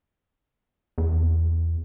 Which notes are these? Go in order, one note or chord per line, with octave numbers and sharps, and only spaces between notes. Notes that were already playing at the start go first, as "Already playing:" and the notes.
E2